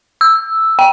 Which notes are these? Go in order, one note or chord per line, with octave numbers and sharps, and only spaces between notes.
E6
G5